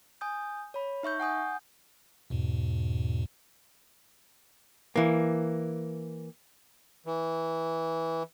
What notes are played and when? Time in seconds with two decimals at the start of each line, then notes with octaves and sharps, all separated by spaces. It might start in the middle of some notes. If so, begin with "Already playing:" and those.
0.21 G#5 D#6 G6
0.74 C#5 B5
1.03 D#4 E5 C#6 G6
1.20 F#5 G#5 D#6 G6
2.30 E2 G#2 B2
4.96 E3 A#3
7.06 E3